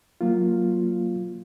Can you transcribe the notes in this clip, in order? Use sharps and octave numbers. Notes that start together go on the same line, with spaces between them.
F#3 A#3 F4